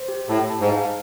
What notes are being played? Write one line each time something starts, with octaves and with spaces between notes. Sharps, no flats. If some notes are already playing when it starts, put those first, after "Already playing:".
Already playing: C5
G4
A2 A5
A5
G#2
F5